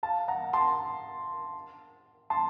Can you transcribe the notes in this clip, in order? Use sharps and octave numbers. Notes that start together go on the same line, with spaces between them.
F5 A5
F#5 A#5
A5 C6
A5 C6